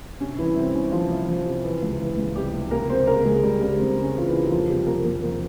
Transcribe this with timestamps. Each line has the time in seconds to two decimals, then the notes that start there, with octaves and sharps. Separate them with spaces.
0.20 C3 C#4
0.38 C2 E3 E4
0.56 C2 C4
0.75 C2 C#4
0.92 C3 F3 F4
1.10 C2
1.28 F3
1.46 C3
1.64 E3
1.82 C#2
1.99 E3
2.17 C#2
2.36 C3 G3 G4
2.53 C#2
2.71 C3 A#3 A#4
2.90 C3 C4 C5
3.07 C#3 A#3 A#4
3.25 C#2 G#3 G#4
3.43 C#2 G3 G4
3.61 C#3 G3 G4
3.79 C#2 C4
3.97 C#3
4.03 C#4
4.15 E3 F4
4.27 E3 E4
4.34 C#3
4.44 G4
4.50 F2 F3 F4
4.69 C3 G3 G4
4.86 C3 A#3 A#4
5.04 F2 A#3 A#4
5.23 F2 A#3 A#4